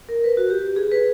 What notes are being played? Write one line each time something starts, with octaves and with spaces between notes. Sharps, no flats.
A#4
B4
F#4
G4
G#4
B4